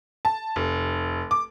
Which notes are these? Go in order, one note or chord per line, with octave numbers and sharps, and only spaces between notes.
A5
F1
D6